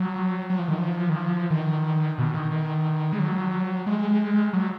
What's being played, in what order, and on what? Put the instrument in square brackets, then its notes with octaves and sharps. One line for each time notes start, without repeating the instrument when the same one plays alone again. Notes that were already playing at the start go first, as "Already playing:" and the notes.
Already playing: [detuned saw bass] F#3
F#3
F3
D#3
F3
D#3
F3
D#3
B2
D#3
D#3
G#3
F#3
G#3
F#3